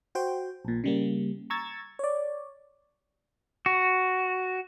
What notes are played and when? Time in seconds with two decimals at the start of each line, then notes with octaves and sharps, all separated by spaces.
0.15 F#4 C5 G5
0.65 A#1 A#2
0.84 C#3 G3 A#3
1.50 A#5 C#6 E6 G#6 A6
1.99 C#5 D5
3.66 F#4